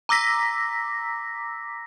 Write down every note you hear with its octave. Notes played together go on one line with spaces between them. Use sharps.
A#5 D6 E6 A#6 B6